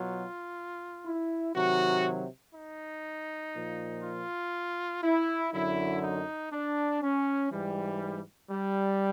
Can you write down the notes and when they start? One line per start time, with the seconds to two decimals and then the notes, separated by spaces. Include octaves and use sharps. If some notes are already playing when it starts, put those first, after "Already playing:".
Already playing: B2 F#3 F4
1.06 E4
1.56 C3 D#3 F#3 F#4
2.55 D#4
3.55 A#2 F3
4.04 F4
5.03 E4
5.53 F#2 D3 F#3 E4
6.03 D#4
6.53 D4
7.02 C#4
7.52 G#2 E3 G3
8.51 G3